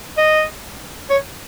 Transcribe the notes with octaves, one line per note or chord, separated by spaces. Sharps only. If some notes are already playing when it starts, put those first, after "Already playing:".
D#5
C#5